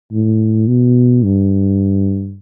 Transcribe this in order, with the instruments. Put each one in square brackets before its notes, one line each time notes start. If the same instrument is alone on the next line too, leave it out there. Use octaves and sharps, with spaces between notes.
[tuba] A2
B2
G2